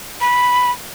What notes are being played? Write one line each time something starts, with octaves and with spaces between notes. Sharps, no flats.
B5